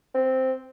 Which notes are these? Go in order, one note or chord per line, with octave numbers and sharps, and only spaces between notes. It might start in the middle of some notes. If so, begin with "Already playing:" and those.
C4